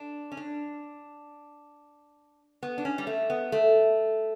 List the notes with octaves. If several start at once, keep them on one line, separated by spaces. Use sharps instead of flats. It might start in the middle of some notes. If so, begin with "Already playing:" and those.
Already playing: D4
C#4
D4
B3
D4
C#4
G3
A3
B3
A3